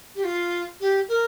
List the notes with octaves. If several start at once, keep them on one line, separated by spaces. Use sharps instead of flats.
G4
F4
G4
A#4